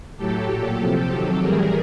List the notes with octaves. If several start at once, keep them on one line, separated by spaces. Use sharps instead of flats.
A2 F#3 G4 A4
A#2 F#3
C3 F3 G4 A4
C3 D#3 F#3
A2 E3 G3 G#4 A#4